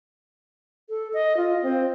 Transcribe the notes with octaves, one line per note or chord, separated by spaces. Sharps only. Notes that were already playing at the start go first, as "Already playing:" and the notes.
A4
D#5
F4
C4